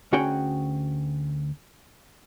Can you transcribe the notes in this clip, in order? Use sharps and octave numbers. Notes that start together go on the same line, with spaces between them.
D2 C#4 F#4 G#4 G5